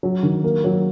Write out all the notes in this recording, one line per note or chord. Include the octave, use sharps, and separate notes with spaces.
F#3
D#3
A#3
F#3